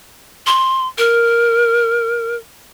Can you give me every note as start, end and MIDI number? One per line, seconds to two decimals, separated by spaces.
0.47 0.88 84
0.98 2.36 70